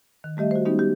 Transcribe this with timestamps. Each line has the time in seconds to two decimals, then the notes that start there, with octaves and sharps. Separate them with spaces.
0.24 D#3
0.37 G3 A3 G4 D#5 E5
0.51 F#4 C5
0.65 G3 G#3 B3 C#4 D#4 G4
0.79 G4